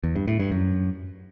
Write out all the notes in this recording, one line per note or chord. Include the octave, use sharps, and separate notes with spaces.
E2
G2
A2
G2
F#2